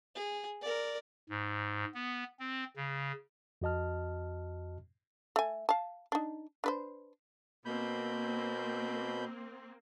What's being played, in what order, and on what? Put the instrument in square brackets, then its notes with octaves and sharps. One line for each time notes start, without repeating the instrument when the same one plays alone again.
[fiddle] G#4
A#4 D5
[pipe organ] G#2
B3
C4
C#3
[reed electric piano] F2 F#4 D#5 A5 F6
[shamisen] A3 G#5
F5 A5
D4 D#4
D4 B4 C5
[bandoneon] B2 B5 G6 [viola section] A#3 C4